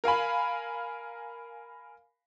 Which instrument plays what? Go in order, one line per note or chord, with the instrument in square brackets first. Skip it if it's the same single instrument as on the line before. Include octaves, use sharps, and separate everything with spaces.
[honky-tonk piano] A#4 F5 G#5 B5